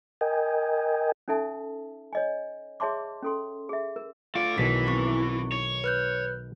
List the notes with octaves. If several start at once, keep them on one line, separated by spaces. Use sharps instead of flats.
A#4 D#5 G5 G#5
C#4 D#4 A4 E5 A5
C#5 D#5 G#5
G#4 C#5 E5 A5 C6 D6
C#4 A4 C6
G#4 E5
A#4
A3 F4 D5
B1 B2 D#3 E3 B6
C4 E4 C#6
C#5
B4 F#6 G6